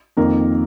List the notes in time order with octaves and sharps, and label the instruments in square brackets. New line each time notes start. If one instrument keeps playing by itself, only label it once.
[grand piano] F2 D#3 A#3 A#4